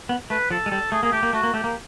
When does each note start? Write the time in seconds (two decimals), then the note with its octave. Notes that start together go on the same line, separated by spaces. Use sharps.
0.09 B3
0.30 A3 B4
0.50 F3 A4
0.66 G#3
0.71 G3 A4
0.92 A3 G#4
1.03 A#3 G#4
1.12 A3 G4
1.23 A#3
1.33 A3 F#4
1.43 A#3
1.54 A3 G4
1.64 A#3